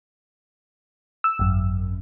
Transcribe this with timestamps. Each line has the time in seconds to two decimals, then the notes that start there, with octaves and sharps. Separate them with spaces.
1.24 E6
1.39 G#1 F#2